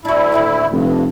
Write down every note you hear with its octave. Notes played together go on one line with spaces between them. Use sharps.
D2 D4 E4 F#4
E2 A#2 D#3
F1 G2